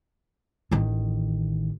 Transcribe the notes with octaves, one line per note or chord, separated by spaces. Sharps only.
A1 D#3